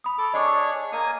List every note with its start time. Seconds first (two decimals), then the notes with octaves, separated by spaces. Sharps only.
0.04 B5 D#6
0.18 A4 D6
0.34 D4 G#4 C#5 D#5 C#6 D6
0.92 A#3 G#5 D#6